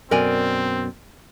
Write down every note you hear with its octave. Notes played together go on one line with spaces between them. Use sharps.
F#2 B2 C4 A#4 D5 G#5